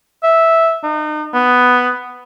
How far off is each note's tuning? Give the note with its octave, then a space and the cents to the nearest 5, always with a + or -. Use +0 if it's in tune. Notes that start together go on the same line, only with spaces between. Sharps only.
E5 -5
D#4 -35
B3 +5